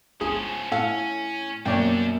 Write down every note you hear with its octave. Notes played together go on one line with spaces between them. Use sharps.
G1 C#2 F3 C#4 G#4
A2 C#4 A4 F5 F#5
F#2 B2 G3 A#3 D4 C#5 D5 G5